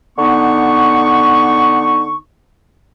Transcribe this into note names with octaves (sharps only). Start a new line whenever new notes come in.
D3 B3 D#4 C#6